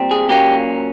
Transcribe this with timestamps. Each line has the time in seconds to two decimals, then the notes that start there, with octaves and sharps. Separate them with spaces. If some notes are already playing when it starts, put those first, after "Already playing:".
Already playing: A#2 G3 C4
0.11 G#4
0.29 A#2 F#3 A#3 C#4 G4